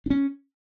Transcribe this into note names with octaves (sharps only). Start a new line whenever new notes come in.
D4
C#4